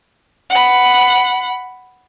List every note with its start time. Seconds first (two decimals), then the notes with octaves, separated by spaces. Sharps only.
0.50 F#5 B5